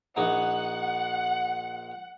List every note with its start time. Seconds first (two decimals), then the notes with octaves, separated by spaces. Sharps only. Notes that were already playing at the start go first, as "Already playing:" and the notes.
0.16 A#1 D#4 F#5